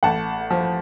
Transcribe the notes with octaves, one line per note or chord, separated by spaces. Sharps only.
A1 F#5 A5
F3